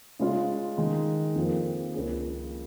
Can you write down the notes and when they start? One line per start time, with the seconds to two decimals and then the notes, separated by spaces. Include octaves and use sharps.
0.19 C#3 G#3 F4
0.78 D#3 G#3 D#4
1.36 F2 F3 A#3
1.94 C#2 C#3 A#3 C#4 G#4